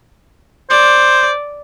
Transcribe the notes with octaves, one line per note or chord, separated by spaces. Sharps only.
C5 D5